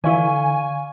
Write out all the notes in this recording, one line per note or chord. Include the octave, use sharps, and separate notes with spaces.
D3 E3 E4 D5 F5 G#5 C#6